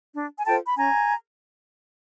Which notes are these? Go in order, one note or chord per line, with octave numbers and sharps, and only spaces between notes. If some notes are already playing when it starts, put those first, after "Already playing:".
D4
G#5
F4 A4 C5 G5 A5
B5
C#4 G#5 A#5